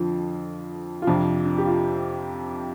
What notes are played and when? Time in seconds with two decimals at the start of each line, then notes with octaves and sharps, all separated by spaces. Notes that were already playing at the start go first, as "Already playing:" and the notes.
Already playing: F2 D3 F3
1.02 F4
1.07 F2 C3 F3 D4
1.46 D4
1.58 G4
1.66 F4